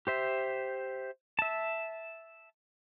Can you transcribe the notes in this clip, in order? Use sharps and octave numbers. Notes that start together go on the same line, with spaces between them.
G4 C5 E5
E5 A5